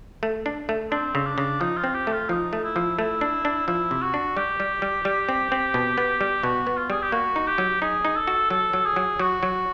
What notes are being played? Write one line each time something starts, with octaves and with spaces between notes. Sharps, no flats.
A3
D4
A3
C4 D4
C#3
D4
C#3
F3 D#4
F4
C4
G4
A3
F4
F3 D#4
A3
E4
F3
A3 E4
D4
D4
F3 E4
C3
F#4
D4
G3 G4
G3
G3
G3
C4
C4
B2
B3
G3
B2 F#4
B3
F4
G3 G#4
G4
A#3 F#4
D#4
G4
F#3
D#4 G#4
D#4
A4
F#4
F#3 A4
F#3
G#4
F#3
F#3 F#4
F#3